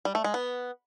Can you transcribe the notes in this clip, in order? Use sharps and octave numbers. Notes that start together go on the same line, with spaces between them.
G3
A3
G#3
B3